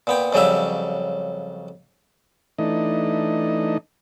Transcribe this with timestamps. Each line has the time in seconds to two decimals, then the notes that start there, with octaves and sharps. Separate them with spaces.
0.07 A#2 B3 G5
0.33 F2 C#3 F#3 G3 E5
2.58 E3 A3 D4 D#4 D#5